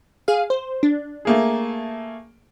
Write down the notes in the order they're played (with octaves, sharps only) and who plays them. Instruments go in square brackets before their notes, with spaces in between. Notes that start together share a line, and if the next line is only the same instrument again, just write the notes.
[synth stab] G#4 F5
C5
D4
[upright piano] A3 A#3 G#4